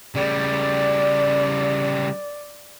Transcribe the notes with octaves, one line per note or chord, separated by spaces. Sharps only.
C#3 G3 D5